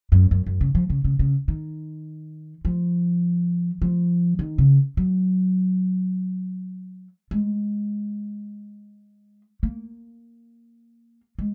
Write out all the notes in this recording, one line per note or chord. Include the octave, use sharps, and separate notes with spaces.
F#2
F#2
F#2
C#3
F3
C#3
C#3
C#3
D#3
F3
F3
D#3
C#3
F#3
G#3
A#3
G#3